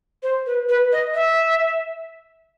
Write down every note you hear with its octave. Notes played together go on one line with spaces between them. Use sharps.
C5
B4
B4
D#5
E5